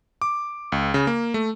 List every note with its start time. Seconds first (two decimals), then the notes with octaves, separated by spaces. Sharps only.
0.22 D6
0.72 C#2
0.94 C#3
1.07 A#3
1.34 A3